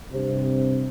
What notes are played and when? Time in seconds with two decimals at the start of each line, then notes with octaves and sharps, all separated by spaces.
0.12 G2 C3